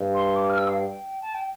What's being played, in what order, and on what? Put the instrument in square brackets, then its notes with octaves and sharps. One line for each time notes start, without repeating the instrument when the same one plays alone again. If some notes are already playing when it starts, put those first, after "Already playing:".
Already playing: [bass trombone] G2
[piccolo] C6
D6
F6
E6
F5
G5
A5
G5